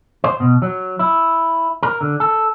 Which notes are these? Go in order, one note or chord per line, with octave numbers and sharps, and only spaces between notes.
C5
B2
F#3
E4
A#4
D3
A4